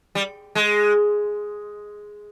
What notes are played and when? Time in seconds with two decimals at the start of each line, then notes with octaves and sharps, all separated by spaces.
0.15 G3
0.55 G#3